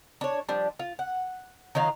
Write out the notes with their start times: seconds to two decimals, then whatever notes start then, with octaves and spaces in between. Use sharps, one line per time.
0.21 D4 C#5
0.49 F3 G3 D4
0.79 F4
0.99 F#5
1.75 D#3 F#3 D#4 F4